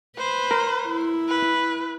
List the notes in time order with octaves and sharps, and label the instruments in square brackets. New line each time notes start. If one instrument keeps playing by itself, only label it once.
[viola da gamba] B4 [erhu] C5
[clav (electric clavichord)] A#4
[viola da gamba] E4
[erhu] B4